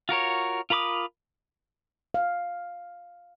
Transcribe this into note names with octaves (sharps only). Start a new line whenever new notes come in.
F4 F#4 A#4 C#5
F4 A#4 B5 D6 D#6
F5